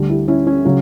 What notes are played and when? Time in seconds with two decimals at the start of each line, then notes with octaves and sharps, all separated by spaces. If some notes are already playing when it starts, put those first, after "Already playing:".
Already playing: D2 D3 G3
0.09 E4 G4
0.28 C#4 E4
0.47 C#4
0.65 C#3 F#3 C#4